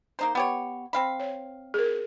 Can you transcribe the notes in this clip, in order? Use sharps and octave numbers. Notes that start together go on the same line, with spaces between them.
A#3 D#4 C5
B3 G4 C#5
C4 F5 B5
C#5
G#4 A#4